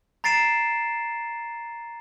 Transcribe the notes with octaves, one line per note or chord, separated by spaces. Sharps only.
A#5 A6 C7 D7 E7